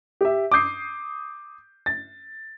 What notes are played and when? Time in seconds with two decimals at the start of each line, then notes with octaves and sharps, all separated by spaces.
0.21 G4 E5
0.52 D6 D#6 G6 C7
1.86 A6